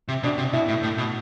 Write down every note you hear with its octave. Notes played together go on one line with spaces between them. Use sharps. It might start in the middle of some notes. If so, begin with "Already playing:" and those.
C3
B2 D4
C3
B2 E4
A2
A2
B2